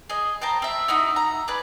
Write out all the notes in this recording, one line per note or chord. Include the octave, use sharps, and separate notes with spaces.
G#4 D#5
C5 G5 A5 A#5
C4 E5
D#4 E4 F#4 D#6
A#5
G#4 B4 D5